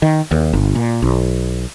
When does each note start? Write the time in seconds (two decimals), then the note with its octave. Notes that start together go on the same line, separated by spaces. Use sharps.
0.02 D#3
0.31 D#2
0.53 G1
0.75 A#2
1.02 B1